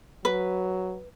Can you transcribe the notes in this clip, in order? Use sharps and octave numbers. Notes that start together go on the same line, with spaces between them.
F#3 B4